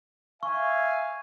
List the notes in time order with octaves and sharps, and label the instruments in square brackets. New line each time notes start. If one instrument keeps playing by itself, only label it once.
[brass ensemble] E5 [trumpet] F5 [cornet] G#5 [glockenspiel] C#6